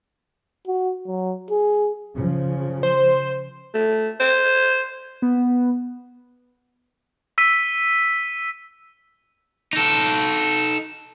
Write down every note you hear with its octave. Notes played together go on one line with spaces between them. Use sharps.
F#4
F#3
G#4
C#3 F3
C5
A3
C5
B3
E6 B6 D#7
D#4 A4